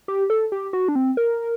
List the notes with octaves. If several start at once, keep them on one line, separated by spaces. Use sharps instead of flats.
G4
A4
G4
F#4
D4
C4
A#4